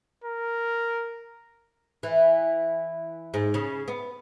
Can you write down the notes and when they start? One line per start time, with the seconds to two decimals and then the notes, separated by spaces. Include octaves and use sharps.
0.24 A#4
2.03 E3
3.34 G#2
3.54 C#3
3.88 B3